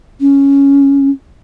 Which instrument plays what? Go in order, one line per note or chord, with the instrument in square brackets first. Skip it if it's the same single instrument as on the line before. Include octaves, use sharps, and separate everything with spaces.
[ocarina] C#4